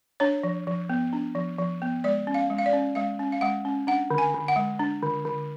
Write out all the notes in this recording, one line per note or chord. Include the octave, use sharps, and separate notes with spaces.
D4 C#5
F3
F3
B3
D4
F3
F3
B3
G#3 D5
C#4
F5
G#3
F5
D5
C#4
G#3 F5
C#4
F5
G#3 F#5
C#4
D4 F#5
D3
G#5
D3
F#5
G#3
D4
D3
D3